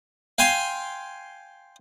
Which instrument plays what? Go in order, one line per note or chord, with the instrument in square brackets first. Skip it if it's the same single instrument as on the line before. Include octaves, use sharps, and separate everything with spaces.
[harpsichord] F5 G5 G#5 C6